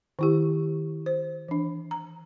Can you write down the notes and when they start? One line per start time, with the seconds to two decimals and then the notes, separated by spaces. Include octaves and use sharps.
0.19 D#3 E4 G4
1.06 C5
1.48 E3 D4
1.91 A#5